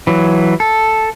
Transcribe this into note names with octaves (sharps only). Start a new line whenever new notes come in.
E3 F#3
A4